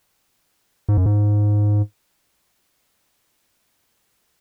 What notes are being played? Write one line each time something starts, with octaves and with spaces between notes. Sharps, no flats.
G#2
F#2
G#2